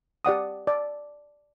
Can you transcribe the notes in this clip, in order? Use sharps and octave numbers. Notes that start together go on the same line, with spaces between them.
G4 D5 F#5 D#6
D5